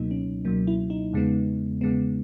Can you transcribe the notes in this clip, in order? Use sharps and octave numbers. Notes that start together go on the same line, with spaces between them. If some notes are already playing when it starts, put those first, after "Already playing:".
Already playing: C#2 B2 F#3 A#3 D#4
C#4
C#2 B2 F#3 A#3
E4
D#4
E2 C#3 G#3 B3
E2 C#3 G#3 B3